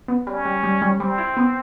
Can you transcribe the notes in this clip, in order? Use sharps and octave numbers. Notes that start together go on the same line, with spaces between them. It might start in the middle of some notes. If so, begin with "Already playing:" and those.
B3
G3 C#4
G3
G3
G3
G3 C4
E4
B3